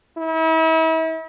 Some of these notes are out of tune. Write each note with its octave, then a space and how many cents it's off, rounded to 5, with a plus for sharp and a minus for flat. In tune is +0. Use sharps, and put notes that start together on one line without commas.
E4 -40